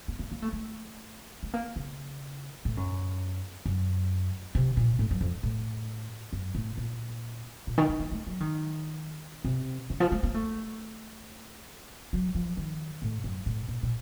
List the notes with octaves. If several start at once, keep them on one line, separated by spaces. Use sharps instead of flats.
A#3
A#3
A#3
A3
A3
A3
A#3
C#3
A2
F#2
F#2
C3
A#2
A2
F#2
F2
A2
F#2
A2
A#2
A#2
D#3
A#3
A#3
A3
F#3
D#3
C3
C#3
F3
A3
A#3
A3
F#3
F3
D#3
A2
F#2
A2
A#2
A#2